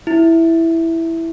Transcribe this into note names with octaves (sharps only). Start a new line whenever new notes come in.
E4